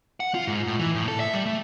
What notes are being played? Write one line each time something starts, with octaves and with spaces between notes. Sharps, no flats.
F#5
F4
G#2
A2
E3
A2
A4
E5
G3
A3